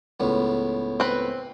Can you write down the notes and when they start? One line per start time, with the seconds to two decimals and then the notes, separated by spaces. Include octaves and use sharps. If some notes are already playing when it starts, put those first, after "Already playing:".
0.20 C#2 A2 B3
1.00 C4 B4